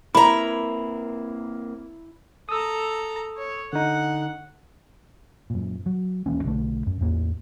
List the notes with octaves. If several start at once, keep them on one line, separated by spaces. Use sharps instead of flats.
A#3 C4 E4 A#5 B5
A4 A#5 D#6 E6
C#5
D3 D#4 F#5
F#2 A#2
F#3
D#1 E3 A#3 C#4
B1 D3 G3 A3
F#2
A1 E2 A#3